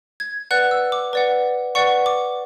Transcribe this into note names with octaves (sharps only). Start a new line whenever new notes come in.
G#6
B4 D5 F#5 F#6
E6
D6
B4 D5 F#5
B4 D5 F#5 C#6
D6